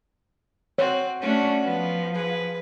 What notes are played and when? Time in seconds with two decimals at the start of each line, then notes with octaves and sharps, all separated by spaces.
0.78 C4 F#4 C#5
1.22 A3 C#4 D4 F#4
1.65 F3 B3
2.14 G#4 B4